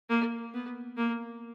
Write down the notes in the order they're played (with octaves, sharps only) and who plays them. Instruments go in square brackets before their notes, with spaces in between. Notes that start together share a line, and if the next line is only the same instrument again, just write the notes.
[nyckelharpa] A#3
B3
A#3